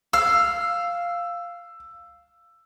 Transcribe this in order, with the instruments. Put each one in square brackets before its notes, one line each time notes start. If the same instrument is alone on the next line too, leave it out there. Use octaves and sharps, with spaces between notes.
[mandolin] F5 [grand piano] E6